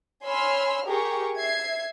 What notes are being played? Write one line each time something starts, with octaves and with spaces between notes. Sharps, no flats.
C#5 G#5 B5 C6 E6 F6
G4 G#4 A#4 G5 C#6
E5 G#6 C7